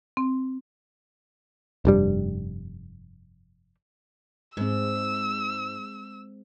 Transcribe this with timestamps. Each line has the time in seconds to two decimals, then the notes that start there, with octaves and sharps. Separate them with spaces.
0.17 C4
1.85 F1 G2 G3
4.57 G#2 G#3 C4 E6